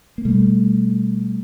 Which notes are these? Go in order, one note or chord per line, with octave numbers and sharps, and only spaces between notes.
A#3
B2 G3 A3